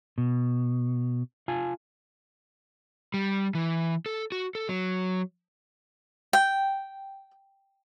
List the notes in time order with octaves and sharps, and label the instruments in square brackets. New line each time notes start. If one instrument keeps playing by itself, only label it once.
[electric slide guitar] B2
F4 G#5 A5
G3
E3
A4
F#4
A4
F#3
[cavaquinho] G5